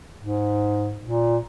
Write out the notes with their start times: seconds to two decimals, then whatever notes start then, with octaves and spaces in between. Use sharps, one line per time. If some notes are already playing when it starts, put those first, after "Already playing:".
0.21 G#2
1.01 A#2